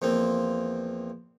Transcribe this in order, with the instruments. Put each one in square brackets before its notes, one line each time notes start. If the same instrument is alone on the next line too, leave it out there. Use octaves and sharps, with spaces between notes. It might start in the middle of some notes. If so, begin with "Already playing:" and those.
[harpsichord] E2 F3 A#3 C4